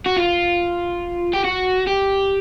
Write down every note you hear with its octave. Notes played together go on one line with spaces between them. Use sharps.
F#4
F4
G4
F#4
G4